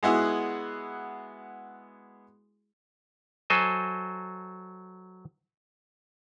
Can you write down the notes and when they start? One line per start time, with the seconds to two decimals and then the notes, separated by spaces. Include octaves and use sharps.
0.03 G#3 B3 E4 F#4 G#4
3.50 F#3 A4 C5 D#5 G#5